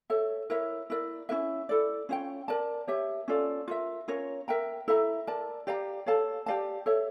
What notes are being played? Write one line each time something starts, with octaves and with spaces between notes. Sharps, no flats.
A4 C#5 E5
E4 A#4 C#5 E5
E4 A#4 D5
C#4 E4 A#4 E5
E4 A4 D5
C#4 F4 C#5 G5
A#4 D5 A5
G4 C#5 E5
C#4 F4 A4 D5
F4 A#4 E5
C#4 F4 A#4 C#5
A#4 E5 G5 A#5
E4 A4 E5 A#5
A#4 D5 A5
G4 D5 F5 A#5
A4 C#5 F5 A5
G4 D5 F5 A5
A4 C#5 E5